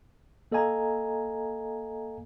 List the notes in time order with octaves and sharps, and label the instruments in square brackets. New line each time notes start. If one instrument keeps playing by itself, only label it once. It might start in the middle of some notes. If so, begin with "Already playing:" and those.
[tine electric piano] A#3 A4 D#5 F5 G#5 A#5